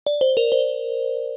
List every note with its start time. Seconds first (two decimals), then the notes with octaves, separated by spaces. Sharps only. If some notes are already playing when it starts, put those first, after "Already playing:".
0.07 D5
0.21 C5
0.37 A#4
0.52 C5